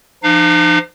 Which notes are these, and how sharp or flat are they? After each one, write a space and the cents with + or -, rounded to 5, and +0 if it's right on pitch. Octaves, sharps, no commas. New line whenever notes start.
F3 -30 D#4 -45 F5 +0